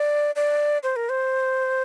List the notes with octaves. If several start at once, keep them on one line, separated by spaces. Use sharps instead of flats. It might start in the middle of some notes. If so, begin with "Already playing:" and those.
Already playing: D5
D5
C5
A#4
C5